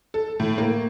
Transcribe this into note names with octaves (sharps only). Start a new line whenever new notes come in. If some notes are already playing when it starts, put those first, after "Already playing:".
A4
A2
A#3